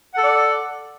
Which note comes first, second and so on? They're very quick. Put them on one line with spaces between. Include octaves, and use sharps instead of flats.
F#5 A4 D5